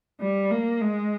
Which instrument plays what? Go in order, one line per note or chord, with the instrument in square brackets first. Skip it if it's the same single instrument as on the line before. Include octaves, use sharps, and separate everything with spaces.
[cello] G3
A#3
G#3